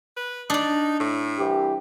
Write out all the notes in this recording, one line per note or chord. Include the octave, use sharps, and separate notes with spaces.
B4
D4 D#4 D5
A2
C2 E3 G4